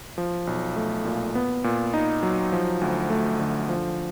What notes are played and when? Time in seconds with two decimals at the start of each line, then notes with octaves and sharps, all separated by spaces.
0.18 F3
0.47 B1
0.76 A3
1.05 A#2
1.35 B3
1.64 A#2
1.94 D#4
2.23 F#3
2.52 F3
2.81 D2
3.10 A3
3.40 D3
3.69 F3